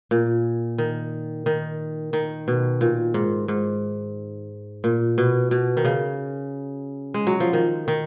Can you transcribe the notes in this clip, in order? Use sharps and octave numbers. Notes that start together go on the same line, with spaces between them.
A#2
D#3
D#3
D#3
B2
A#2
G#2
G#2
A#2
B2
B2
D#3
C#3
G#3
F#3
F3
D#3
D#3